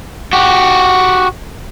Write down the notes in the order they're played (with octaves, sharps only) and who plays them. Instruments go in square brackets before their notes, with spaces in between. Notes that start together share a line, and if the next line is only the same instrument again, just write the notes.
[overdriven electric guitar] F#4 G4